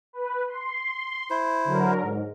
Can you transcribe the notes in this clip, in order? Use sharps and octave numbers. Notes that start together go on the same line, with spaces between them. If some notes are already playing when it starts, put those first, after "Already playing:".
B4
C6
E4 C5
D3 F#3 A#4
G#2